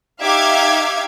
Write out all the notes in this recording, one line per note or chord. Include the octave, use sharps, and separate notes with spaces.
D#4 G4 E5 F5 D6 G#6